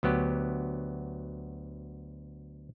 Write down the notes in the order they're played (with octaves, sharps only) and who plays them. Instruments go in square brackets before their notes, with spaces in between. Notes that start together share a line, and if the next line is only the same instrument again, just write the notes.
[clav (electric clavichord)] D2 F#3 B3 G4